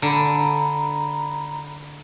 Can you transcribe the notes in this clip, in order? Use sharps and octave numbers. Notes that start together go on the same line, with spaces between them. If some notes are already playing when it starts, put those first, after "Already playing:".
D3 A#5 B5